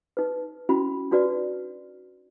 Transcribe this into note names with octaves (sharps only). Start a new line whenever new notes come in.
D#4 B4
C#4 E4 F#4 B5
D4 D#4 F#4 B4 D5